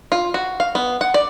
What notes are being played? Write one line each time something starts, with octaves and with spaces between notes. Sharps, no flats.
F4
F#4
F5
B3
F#5
D5